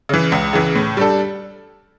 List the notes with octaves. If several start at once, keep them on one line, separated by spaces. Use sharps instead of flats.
C#3 E3
C#2
C#3 E3
A2
G3 D4 A4